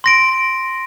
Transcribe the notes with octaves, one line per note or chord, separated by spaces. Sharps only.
C6 A#6 D7